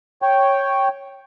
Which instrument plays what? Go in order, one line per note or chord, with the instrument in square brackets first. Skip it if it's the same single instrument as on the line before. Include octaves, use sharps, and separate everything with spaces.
[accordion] C#5 G5